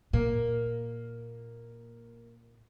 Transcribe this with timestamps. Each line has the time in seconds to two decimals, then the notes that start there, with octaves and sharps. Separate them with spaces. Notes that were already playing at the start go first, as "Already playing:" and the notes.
0.13 A#2 A#3